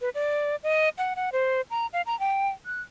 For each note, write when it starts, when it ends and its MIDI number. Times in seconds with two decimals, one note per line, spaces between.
0.01 0.09 71
0.15 0.56 74
0.64 0.89 75
0.98 1.14 78
1.16 1.30 78
1.32 1.61 72
1.71 1.87 82
1.93 2.02 77
2.06 2.18 82
2.20 2.49 79
2.66 2.81 90